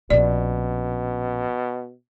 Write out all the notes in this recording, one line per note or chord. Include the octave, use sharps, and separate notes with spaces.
A#1 B2 C#4 D5